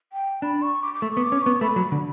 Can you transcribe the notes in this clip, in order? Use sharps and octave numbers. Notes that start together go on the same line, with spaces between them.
G5
D4 B5
C#6
D6
D6
A3 C#6
B3
D6
C#4
B3 C#6
A3 B5
F#3
D3